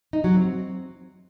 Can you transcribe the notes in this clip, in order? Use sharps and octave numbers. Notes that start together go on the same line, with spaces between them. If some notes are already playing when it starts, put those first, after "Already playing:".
D#4
F#3
C4